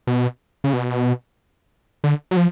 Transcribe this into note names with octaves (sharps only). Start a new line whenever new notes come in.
B2
C#3
B2
D3
F#3
F3